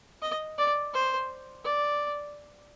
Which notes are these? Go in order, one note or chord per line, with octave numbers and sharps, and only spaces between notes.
D#5
D5
C5
D5